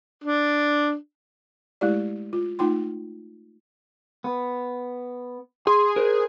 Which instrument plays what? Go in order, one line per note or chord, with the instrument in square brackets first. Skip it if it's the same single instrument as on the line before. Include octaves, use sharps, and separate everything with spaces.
[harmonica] D4
[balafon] G#3 A3 E4 G4 D5
F4
A3 D#4 F4 G5 C6
[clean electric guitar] B3
[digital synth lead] G#4 [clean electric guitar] C6
[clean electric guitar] A#4 C5